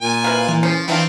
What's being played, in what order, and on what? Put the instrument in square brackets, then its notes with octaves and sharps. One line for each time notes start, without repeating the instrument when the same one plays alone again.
[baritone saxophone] A#2 [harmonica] G#5
[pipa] C3 E4 B4 [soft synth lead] F5
[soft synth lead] E3 [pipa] F4
[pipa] C#3 C#4 C5 [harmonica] F3
[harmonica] D#3 C4 [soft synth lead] E3 [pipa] B3 D4 F4